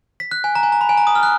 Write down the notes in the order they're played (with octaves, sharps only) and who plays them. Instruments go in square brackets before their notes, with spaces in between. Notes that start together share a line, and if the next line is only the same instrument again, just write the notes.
[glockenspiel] B6
F#6
G#5
A#5
G#5
A#5
B5
G#5
A#5
D#6
F6
F#6